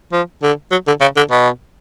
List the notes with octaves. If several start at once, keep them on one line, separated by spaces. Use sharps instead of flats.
F3
D3
F#3
D3
C#3
D3
B2